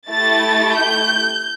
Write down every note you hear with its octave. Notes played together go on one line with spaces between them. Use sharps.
A3 E4 G4 A6
G6